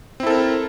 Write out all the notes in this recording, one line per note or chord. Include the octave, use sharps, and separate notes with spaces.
C4 E4 A4 A#4